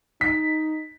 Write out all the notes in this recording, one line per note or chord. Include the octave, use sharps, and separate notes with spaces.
D#4 B6